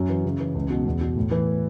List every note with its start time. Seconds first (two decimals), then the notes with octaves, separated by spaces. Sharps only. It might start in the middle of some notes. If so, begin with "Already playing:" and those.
Already playing: F#2 F#3
0.09 E3
0.25 C#3
0.40 E3
0.55 C#2
0.70 B2
0.86 E2
1.01 B2
1.16 A2
1.31 E3